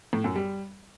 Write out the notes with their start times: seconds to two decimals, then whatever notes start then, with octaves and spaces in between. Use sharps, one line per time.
0.13 A2
0.24 F#2
0.36 G3